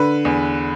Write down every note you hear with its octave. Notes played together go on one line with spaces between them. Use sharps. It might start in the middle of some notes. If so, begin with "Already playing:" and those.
Already playing: D3 B4
E2